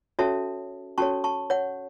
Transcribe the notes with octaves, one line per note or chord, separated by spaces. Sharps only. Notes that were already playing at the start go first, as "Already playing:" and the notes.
C#4 F#4 A4 C#5 E5 A5
C#4 F#4 A4 C#5 A5 C#6
A5 C#6
C#5 F#5